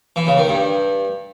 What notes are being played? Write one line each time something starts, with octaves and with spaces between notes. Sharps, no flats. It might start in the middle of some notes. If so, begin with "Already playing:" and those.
E3
C#3
D#3
G2